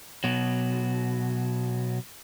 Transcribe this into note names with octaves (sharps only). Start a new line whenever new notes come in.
B2 F#3